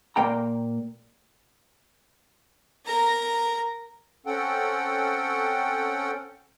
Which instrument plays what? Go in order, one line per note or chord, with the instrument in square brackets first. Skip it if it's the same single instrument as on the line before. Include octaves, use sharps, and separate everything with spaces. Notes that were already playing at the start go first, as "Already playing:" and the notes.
[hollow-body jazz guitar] A#2 A#3 G5 A#5
[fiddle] A#4 A#5
[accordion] C4 C#4 A4 F#5 G5